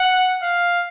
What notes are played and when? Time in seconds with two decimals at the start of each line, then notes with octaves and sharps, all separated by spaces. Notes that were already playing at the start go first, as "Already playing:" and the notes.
Already playing: F#5
0.43 F5